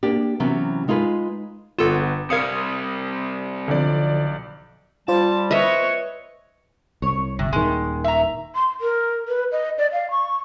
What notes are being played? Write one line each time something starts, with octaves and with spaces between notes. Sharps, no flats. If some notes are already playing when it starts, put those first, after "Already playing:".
A#3 D4 G4
C3 E3 F#3 B3 C#4
G#3 D#4 F4 G#4 A#4 B4
G1 B3 F4 A4 E7
C3 G3 A#4 F5 D#6 G#6 C#7
B1 D3 F3 D5
G3 F4 C5 A5
B4 C#5 D#5 E5
C2 C#5
G1 C3
D#1 D#3 G#3
E5 A#5
C6
A#4
B4
D#5
D5
F5
C#6